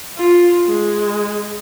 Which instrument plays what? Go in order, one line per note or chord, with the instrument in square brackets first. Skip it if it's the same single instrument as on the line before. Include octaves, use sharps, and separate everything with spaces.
[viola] F4
G#3